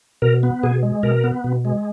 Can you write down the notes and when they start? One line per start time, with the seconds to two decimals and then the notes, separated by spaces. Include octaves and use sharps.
0.22 B2 A#4
0.43 B3
0.63 B2 G#4
0.83 G#3
1.03 B2 A#4
1.24 B3
1.44 B2
1.65 G#3